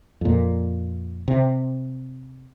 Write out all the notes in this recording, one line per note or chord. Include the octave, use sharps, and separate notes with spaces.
F2 A#2
C3